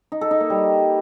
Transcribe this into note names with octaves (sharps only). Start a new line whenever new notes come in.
D#4
A4
D#4
A#3
G3